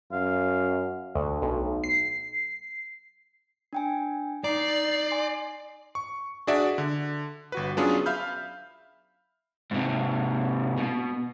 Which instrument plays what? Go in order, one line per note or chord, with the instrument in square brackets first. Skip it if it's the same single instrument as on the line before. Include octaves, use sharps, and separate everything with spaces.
[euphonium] F#2 [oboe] F5
[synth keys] D2
B1
C7
[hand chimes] D4 G5 G#5
[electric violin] D#4 C7 [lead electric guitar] D5 [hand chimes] A#5
[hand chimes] G#5 C6
[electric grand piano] C#6
D4 F#4 G#4 D5 E5
D3
G1 F#4 B4
F#3 B3 C#4 D4 F4 G#4
E5 F5 B5 F6 G6
[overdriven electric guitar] G#2 C3
B2